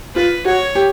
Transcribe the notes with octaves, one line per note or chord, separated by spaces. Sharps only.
F4 B4
F#4 C#5
G4